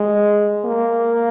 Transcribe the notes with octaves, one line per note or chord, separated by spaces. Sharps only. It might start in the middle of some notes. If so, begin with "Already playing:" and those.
Already playing: G#3
A#3